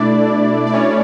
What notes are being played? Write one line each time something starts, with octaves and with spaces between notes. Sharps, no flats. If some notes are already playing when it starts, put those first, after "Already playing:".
Already playing: B2 A3 D4 E4 D5
D5
C#4 C#5